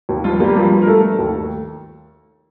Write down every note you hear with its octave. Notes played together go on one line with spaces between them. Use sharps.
D#2
G2 F3 F4
G3 A#3 G4
G2 F3 F4
G2
A#4
A3 A4
A3
D#2